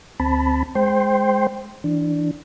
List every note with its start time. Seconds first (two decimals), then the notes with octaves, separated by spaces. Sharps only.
0.20 D2 C4 A5 B5
0.75 G#3 C5 G5 C6
1.84 E3 D4